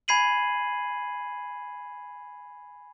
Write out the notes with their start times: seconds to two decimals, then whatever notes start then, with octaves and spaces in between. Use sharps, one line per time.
0.08 G#5 B5 G#6 C7 D#7 F#7